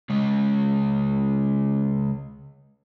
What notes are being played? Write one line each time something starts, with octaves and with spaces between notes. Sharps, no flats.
C#3 G#3